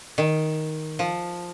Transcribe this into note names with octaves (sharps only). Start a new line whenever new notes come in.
D#3
F3